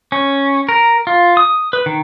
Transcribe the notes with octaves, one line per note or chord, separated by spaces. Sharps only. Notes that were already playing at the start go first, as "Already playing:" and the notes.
C#4
A#4
F4
D#6
B4
D#3